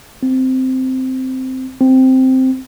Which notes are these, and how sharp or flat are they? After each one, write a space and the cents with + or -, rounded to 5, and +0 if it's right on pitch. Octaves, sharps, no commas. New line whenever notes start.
C4 -10
C4 -5